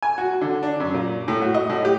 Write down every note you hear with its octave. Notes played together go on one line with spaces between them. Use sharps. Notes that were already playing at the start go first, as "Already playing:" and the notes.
G#5
F#4
D3
D4
F#2
A#2
A2
F#4
D#5
A2
G4